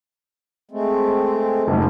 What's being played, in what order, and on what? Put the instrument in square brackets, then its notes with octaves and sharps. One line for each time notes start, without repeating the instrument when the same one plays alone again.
[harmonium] G#3 A3 C4
[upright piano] F1 G#2